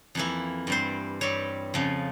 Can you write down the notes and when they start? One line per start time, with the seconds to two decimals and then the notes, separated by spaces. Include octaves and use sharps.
0.15 F2 E3 A#3 E4
0.67 G2 G3 C4 C5
1.21 G2 G3 C4 C#5
1.74 F2 C#3 F3